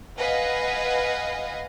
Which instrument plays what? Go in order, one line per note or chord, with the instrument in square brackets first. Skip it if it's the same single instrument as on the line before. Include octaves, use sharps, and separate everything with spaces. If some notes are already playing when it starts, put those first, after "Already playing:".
[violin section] B4 D#5 F5 F#5 G#5